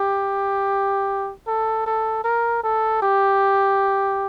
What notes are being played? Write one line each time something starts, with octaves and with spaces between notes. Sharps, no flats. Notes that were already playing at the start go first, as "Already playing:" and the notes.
Already playing: G4
A4
A4
A#4
A4
G4